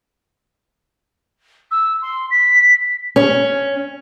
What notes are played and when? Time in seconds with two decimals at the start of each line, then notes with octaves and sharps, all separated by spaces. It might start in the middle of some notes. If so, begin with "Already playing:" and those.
1.71 E6
2.02 C6
2.31 B6
3.16 C#4